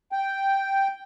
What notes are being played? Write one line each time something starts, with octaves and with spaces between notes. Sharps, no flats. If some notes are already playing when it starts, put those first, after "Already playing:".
G5